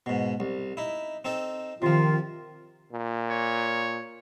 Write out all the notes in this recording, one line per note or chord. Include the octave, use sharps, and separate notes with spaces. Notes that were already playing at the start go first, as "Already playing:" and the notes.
G#2 B2
C2
D#4 E4
C4 D#4 A4
C3 D#3 F3 F4
A#2
C#5